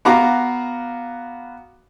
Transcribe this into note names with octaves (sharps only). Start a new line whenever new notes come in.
B3 F#4 F5 A#5 D6